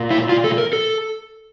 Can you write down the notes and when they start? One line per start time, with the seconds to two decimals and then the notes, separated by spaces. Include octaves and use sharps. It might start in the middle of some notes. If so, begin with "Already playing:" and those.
Already playing: A#2
0.11 E4
0.29 F4
0.44 A4
0.58 A#4
0.73 A4